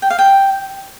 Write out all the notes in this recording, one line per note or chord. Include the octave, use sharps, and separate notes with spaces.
G5
F5
G5